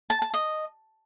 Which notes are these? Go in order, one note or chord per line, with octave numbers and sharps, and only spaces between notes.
A5
A5
D#5